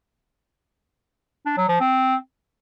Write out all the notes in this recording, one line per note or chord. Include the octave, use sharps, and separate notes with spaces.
D4
F#3
F3
C4